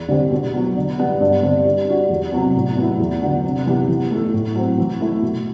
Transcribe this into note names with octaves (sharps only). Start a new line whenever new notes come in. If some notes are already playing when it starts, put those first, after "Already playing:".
Already playing: E2
D3 G3 C4 G4
B2
F#3 B3
D3
G3 B3
G2
D3 G3 C4
G3
D4 F#4
E2
C3 F#3 B3
A2
F#3 B3 E4
E2
D3 F#3 B3
C3
E3 B3 E4 G4
E3
A3 E4 A4
A2
F#3 C4
E3
A3 E4
B2